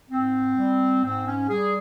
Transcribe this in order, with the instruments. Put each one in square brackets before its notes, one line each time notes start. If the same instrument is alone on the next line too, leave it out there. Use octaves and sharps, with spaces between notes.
[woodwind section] G#2 C4
G3
G#2 C4
C#4
G3 G#4